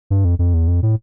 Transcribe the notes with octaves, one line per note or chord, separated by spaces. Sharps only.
G2
F2
F2
E2
F2
A2